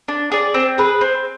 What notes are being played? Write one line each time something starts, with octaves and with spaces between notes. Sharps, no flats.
D4
G#4 D5
C4
G#4 B4
C4